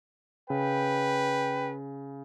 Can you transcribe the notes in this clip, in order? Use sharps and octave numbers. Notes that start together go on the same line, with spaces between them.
C#3 B4 G5